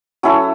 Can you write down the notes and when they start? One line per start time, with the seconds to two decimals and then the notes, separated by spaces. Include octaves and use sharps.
0.23 F#3 C#4 E4 A4